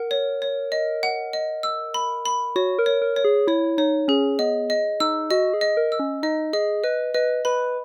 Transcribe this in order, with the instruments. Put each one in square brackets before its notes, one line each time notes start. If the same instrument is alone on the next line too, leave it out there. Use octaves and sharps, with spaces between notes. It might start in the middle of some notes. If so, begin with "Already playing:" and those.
Already playing: [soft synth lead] A#4 [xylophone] F#5
[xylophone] C#5
C#5
D#5
F#5
D#5
E6
B5
B5
[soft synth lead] F#4 [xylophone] C#5
[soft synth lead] A#4
[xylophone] C#5
[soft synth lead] A#4
[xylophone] C#5
[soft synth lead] G#4
[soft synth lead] E4 [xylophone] C#5
[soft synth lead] D#4 [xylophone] C#5
[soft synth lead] C#4 [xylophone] G#4
[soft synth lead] B3 [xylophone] D#5
[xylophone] D#5
[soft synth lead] D#4 [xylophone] E6
[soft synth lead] F#4 [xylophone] D#5
[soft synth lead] G#4
[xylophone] D#5
[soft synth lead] A#4
[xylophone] E6
[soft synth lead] C#4
[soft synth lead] D#4 [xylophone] D#5
[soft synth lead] G#4 [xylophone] D#5
[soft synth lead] B4 [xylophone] D#5
[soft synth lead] B4 [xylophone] D#5
[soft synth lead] B4 [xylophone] B5